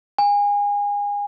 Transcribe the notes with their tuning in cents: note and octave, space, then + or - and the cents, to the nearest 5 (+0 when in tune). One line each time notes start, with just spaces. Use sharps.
G#5 -30